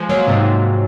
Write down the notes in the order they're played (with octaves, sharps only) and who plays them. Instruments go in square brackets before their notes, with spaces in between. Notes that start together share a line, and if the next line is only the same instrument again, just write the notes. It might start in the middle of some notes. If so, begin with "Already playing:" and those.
Already playing: [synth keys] F3 G#3
F#3 A#3
G#2 C3
G#2